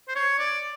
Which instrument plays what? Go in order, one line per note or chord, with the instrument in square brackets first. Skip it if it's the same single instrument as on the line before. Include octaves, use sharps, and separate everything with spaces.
[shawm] C5
C#5
D5